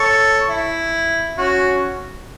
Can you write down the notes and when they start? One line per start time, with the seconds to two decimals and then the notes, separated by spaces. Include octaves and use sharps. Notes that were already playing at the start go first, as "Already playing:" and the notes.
Already playing: A4 C#5
0.50 E4
1.38 C#4 F#4